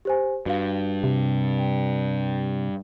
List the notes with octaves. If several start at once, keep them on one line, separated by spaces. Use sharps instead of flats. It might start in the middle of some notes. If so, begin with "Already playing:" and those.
G4 C5 G#5
G2 F#4 F5
C3
G5